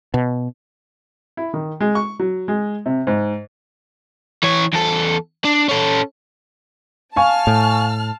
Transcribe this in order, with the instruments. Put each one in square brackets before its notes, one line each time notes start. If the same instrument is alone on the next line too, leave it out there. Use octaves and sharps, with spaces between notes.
[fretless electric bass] B2
[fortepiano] E4
D#3
G#3
C#6
F#3
G#3
C3
G#2
[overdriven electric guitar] E3 C#5
E2 A4
D4
C#4 A4
[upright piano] F5 G#5 C#6 [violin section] A5 F6
[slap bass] A2